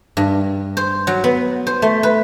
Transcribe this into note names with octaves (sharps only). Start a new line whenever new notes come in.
G2
C5
F#3
B3
C5
A3
B4